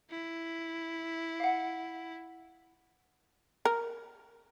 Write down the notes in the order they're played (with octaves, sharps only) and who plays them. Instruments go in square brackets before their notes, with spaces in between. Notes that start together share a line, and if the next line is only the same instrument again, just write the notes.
[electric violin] E4
[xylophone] F5 F#5
[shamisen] A#4